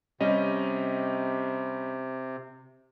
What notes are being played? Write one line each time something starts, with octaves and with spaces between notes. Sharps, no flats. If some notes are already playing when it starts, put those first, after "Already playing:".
C3 G3 C#4 D#5